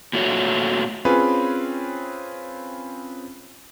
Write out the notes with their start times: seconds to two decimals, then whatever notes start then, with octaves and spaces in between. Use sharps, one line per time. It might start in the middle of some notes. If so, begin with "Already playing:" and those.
0.13 A#2 A3 F#4 C#5
1.05 C4 C#4 F4 G#4 B4 C#5